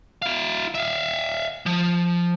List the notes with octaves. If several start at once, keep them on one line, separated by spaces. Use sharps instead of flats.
E4 F5
E5 F5
F3